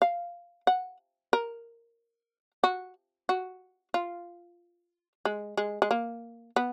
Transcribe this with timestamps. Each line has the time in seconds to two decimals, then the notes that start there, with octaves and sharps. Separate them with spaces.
0.02 F5
0.67 F#5
1.33 A#4
2.64 F#4
3.29 F#4
3.94 F4
5.25 G#3
5.57 G#3
5.82 G#3
5.91 A#3
6.56 B3